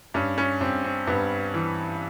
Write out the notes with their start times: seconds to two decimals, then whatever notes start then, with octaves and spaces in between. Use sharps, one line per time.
0.14 G2 C#4
0.38 C#4
0.61 G2 C4
0.84 C4
1.07 G2 B3
1.54 E3